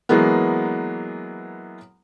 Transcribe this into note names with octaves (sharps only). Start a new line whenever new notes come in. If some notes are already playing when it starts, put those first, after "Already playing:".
E3 F#3 G#3 A#3 B3